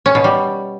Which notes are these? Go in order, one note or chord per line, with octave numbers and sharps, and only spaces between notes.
C#4
B2
G3